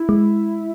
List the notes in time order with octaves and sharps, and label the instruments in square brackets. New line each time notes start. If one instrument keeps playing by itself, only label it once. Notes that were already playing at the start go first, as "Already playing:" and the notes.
Already playing: [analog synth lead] E4
[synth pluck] G#3